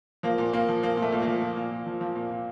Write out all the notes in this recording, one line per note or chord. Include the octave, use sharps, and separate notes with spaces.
F3 A#3
A#2
A#2 A#3
F3
F3 A#3
A#2
A3
A#2
A#3
F3
F3
A#2
A#2
F3
F3
A#2
A#2